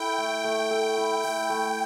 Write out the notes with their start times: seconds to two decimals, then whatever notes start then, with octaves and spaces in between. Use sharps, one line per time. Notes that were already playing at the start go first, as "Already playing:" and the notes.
Already playing: E4 A4 G5
0.18 A3
0.44 A3
0.71 A4
0.97 E4
1.23 A3 G5
1.50 A3